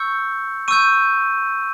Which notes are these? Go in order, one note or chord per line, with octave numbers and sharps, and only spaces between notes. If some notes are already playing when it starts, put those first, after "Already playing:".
Already playing: C#6 E6 G6 C#7
C#6 E6 G6 D#7